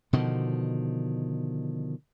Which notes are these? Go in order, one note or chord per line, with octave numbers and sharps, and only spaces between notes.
B2 D3 D#3 F3